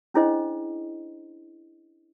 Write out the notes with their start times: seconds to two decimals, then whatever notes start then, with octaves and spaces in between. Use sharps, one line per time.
0.14 C#4 D4 E4 G#4 C5 D#5